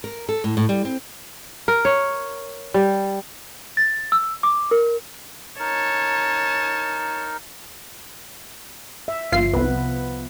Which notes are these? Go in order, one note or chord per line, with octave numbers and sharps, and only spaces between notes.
A#4
A4
A2
A2
G3
C4
A#4
C#5
G3
A6
E6
D6
A#4
D#4 A#4 C#5 A5
E5
G1 F3 F4 C7
C2 B3 B4